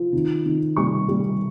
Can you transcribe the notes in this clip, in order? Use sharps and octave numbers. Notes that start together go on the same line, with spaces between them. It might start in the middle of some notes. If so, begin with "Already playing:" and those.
Already playing: F3
D#3
D#3
G3 C#6
G3